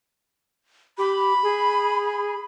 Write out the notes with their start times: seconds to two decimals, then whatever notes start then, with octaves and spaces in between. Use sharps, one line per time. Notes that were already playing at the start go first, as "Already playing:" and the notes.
0.98 G4 B5
1.43 G#4